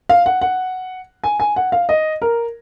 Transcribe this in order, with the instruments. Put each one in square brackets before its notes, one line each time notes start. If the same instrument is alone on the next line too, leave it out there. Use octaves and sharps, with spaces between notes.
[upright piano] F5
F#5
F#5
G#5
G#5
F#5
F5
D#5
A#4